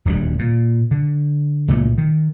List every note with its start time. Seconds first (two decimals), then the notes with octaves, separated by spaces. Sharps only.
0.05 D#1 D2 F#3 G3
0.39 A#2
0.91 D3
1.68 C#2 A#2 A3
1.98 D#3